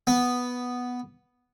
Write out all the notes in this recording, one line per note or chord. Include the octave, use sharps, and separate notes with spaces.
B3